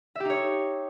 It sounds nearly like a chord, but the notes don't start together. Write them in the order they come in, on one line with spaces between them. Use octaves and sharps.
E5 G4 D#4 C#5